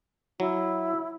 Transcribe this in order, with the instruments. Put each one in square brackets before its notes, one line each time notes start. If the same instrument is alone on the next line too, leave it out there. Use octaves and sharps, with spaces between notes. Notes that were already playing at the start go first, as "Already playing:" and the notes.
[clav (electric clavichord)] F#3 [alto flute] E4